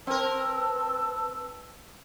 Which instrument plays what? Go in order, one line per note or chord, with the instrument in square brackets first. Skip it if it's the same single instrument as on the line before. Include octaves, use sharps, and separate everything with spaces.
[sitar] C4 A#4 [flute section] B4 A5 E6